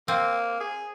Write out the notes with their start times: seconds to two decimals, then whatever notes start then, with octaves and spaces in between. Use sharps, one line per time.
0.08 A#3 C4
0.60 G#4